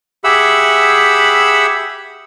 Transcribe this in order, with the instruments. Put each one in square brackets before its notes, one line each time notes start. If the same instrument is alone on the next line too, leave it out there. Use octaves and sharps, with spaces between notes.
[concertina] G4 G#4 E5 F#5 B5 E6